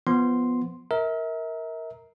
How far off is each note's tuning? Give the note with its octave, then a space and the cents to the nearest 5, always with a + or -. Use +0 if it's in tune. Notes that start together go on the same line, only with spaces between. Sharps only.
F3 +0 B3 +0 C6 +0
A#4 +0 E5 -40